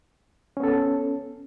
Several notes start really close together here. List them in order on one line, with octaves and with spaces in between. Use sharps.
C#4 B3 A4